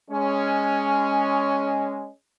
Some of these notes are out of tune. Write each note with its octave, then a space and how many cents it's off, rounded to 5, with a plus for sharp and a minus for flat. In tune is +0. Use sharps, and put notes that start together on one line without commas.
G#3 -5 C#4 +5